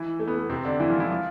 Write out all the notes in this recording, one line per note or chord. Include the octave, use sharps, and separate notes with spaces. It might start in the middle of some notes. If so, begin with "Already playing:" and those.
Already playing: E3 E4
A3
B3
A3
C3 C4
D3 D4
E3 E4
F3 F4
E3 E4
F3 F4